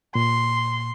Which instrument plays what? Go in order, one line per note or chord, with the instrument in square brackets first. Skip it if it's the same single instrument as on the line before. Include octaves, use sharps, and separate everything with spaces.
[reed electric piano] A#2 [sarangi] C6